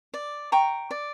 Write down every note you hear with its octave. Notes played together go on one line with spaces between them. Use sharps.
D5
G5 A#5 C#6
D5